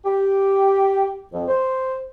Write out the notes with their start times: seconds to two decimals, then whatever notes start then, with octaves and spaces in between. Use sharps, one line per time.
0.05 G4
1.33 F2
1.48 C5